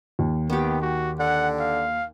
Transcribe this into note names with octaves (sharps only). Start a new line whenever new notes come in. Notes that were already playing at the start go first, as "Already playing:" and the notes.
D#2
D#3 B3 G4
F#4
D3 F#5
F5